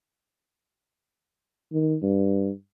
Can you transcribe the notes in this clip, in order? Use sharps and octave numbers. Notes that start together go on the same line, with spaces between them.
D#3
G2